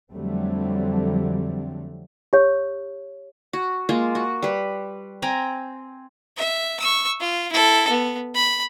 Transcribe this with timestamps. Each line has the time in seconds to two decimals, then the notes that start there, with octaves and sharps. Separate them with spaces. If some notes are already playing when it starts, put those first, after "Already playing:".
0.11 F2 D3 F#3 G3 A3 C4
2.33 G4 C#5
3.53 F#4
3.89 G#3 A#3 F4
4.15 F#4
4.42 G3 B4
5.22 C4 G5 G#5 A#5
6.37 E5
6.80 C#6 E6
7.20 F4
7.52 E4 A4
7.89 B3
8.35 B5